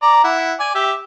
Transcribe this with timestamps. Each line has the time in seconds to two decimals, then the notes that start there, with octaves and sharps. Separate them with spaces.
0.02 D5 A#5
0.24 E4 F#5
0.60 D5 G#5
0.75 G4 E5